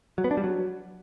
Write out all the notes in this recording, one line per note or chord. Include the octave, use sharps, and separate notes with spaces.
F#3
B3
D4
G3
F#3